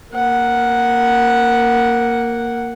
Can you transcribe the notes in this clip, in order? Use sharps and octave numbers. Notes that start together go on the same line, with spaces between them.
A#3 F#5